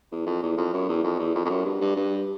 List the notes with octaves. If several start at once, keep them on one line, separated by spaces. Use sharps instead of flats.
E2
F2
E2
F2
F#2
E2
F2
E2
F2
F2
F#2
G2
G2
G2